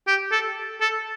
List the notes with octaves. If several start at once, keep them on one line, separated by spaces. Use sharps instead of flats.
G4
A4
A4